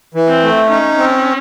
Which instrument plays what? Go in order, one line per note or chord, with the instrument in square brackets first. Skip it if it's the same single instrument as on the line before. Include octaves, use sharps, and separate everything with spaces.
[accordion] E3
[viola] C4
[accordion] A3
[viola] C#4 [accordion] D#4
[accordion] C4